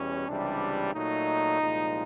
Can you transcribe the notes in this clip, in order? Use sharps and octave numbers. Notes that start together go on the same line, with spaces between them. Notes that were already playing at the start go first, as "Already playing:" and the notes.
Already playing: E2 B2 G3 C#4
C#2 C3 E3 G3 D4
A#2 F#3 A3 D#4
C2 A#2 F3 G#3